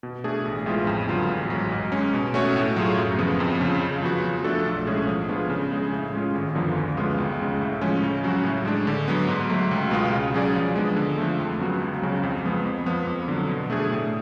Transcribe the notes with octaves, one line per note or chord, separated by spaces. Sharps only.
B2
A3 D4 G#4
A1
A2 G#3 B3 F4
F2
D3 F#3 B3 F4
A1
G#2 F#3
G#2
G#3 C#4
B2
A3 C#4 F#4 C#5
A2
F#3 A3 F4 G#4
F#2
C#3 F3 B3
F2
C#3 F3
C#3
F3 B3 F#4
F3
A3 D4 F#4 A4
B1
A2 G#3 C#4 G#4
F3
B3 D4 F4 G#4
C#3
G#3 C#4 G#4
A2
G#3 C#4 F4
G#1
F#2 D3 F3 B3
D2
C#3 G#3 B3 F4
C#2
C#3 G#3
A2
F3 G#3 C#4
C#3
F#3 C#4 F#4
A2
G#3 D4
D3
F#3 B3
G#2
F#3 A3
C#2
B2 G#3 B3 F4
C#3
F#3 C#4 G#4 D5
F3
G#3 B3 D4
D3
F3 A3
F2
C#3 F#3 B3 F#4
C#2
C#3 F#3
F2
F3 G#3 B3
F2
F3 B3
F2
D3 F#3
B2
A3 D4 G#4
A2